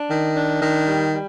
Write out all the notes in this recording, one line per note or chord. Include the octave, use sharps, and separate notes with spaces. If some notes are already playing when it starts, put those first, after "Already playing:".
Already playing: D4
D#3
D4
D#3
G3
G3